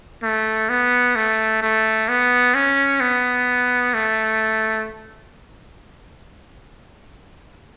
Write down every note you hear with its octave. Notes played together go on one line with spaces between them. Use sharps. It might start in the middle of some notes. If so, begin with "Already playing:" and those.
A3
B3
A3
A3
B3
C#4
B3
A3